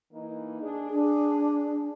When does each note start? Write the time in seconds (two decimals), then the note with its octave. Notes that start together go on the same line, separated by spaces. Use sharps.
0.13 E3 A#3 D#4
0.62 D4 G#4
0.90 D4 G#4